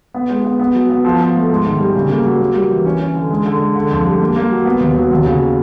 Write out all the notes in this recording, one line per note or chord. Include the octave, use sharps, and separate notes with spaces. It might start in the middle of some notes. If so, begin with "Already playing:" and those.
B3
G#3
B3
B3
F#3
B3
F3
F3
A3
G#2
D#3
G3
C#3
A#3
F#3
A#3
G3
E3
C#4
C#4
D3
G#3
D3
G#3
D3
F2
G3
A#3
A#3
F#3
B3
D#2
F#3
D#2
C#3